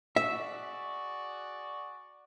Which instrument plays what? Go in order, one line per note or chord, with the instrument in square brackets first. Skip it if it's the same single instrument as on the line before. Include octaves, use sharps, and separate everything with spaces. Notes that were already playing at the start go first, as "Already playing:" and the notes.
[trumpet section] F#4 G#4 D5 [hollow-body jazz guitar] E5